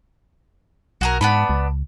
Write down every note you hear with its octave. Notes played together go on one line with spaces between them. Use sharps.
B1 F#4 G#4 A#4
G#2 B3 D4 B5
C#2